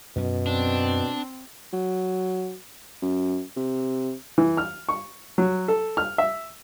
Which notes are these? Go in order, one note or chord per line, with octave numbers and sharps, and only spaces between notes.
F#2 B2 C#4
C4 D4
F#3
F#2
C3
E3
F6
C#6
F#3
A4
F6
E5